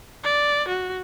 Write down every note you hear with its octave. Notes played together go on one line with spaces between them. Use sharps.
D5
F#4